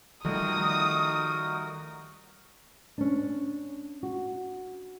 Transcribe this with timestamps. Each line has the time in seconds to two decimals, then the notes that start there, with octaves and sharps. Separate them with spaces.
0.25 D#3 F3 G3 A3 D#4 F#4 A#4 D#6
2.98 C#4 D4
4.03 F#4